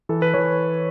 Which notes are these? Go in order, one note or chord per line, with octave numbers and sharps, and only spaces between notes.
E3 A4
B4
E3 C#5